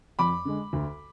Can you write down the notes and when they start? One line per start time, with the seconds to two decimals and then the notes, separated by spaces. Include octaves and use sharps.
0.19 F2 B5 D6
0.45 D3 G#3
0.73 D2